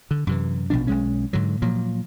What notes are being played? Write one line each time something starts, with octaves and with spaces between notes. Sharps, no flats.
D3
F#2 C3 E3
A#1 B2 F3 D4
B1 G#3 C#4
G#2 D3 F#3
A#2 F3 F#3